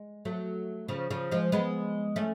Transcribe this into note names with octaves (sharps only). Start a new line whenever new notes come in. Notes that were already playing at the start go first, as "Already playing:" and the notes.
Already playing: G#3
F#3 A3
C#3 F3
C#3 F3
F3 G#3
G#3 B3
A3 C#4